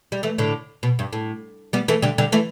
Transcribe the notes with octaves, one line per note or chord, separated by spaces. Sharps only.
G3
E3 A3
A2 D3
B2
G2
A2
G3 B3
E3 A3
D3 G3
D3 G3
E3 A3